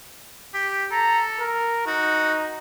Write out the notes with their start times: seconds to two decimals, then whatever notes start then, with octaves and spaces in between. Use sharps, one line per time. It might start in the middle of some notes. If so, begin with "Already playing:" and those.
0.54 G4
0.92 A4 A#5
1.39 A#4
1.87 D#4 F#4